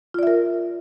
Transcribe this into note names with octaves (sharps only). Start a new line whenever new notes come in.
F4 A#4 D5 E5